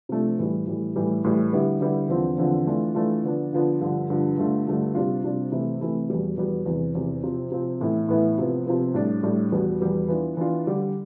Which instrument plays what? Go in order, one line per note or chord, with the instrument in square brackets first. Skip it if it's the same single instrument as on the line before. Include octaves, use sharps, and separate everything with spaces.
[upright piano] C3 F3 A3 D4
A2 E3 G3
A2 E3 G3
A2 E3 G3
A2 E3 G3
D3 G3 B3 E4 G4
D3 G3 B3 E4 G4
E2 D3 F3 C4
E2 D3 F3 C4
E3 A3 D4 F4
E3 A3 D4 F4
D3 F3 B3 D4
D3 F3 B3 D4
G2 D3 F3
G2 D3 F3
G2 D3 A3 D4 F4
G2 D3 A3 D4 F4
C3 G3 D4 F4
C3 G3 D4 F4
C3 E3 A3 E4
C3 E3 A3 E4
E2 B2 G3 B3
E2 B2 G3 B3
E2 C3 E3
E2 C3 E3
C3 F3 C4
C3 F3 C4
A2 E3 B3 E4
A2 E3 B3 E4
C3 F3 B3
C3 F3 B3
A2 G3 D4
A2 G3 D4
E2 B2 G3 B3
E2 B2 G3 B3
E3 B3 D4 F4
E3 B3 D4 F4
D3 G3 D4 G4